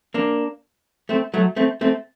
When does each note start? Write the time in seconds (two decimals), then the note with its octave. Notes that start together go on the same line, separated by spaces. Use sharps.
0.14 A#3 D4
1.09 A3 C4
1.34 F#3 A3
1.56 A3 C4
1.81 A3 C4